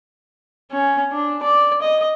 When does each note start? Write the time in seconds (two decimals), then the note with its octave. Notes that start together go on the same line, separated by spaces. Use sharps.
0.72 C#4
1.12 D4
1.43 D5
1.82 D#5